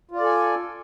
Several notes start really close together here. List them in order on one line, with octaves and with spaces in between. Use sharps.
F4 D5 A4 G#5